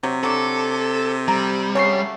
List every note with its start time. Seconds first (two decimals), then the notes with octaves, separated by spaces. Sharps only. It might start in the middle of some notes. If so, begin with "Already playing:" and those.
0.04 C3 F#3
0.23 F#3 D4 A4
1.28 G3 A#5
1.75 C#3 F#3 A3 C#5 C#6 C7